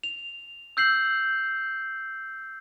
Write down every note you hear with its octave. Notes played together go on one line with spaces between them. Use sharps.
F7
E6 G6 C7 F#7